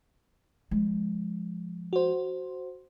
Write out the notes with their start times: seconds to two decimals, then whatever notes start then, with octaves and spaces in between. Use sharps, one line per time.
0.71 F3 G#3
1.93 F#4 C5